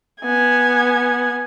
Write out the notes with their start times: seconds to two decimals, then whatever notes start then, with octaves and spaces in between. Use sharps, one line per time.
0.22 B3 G#5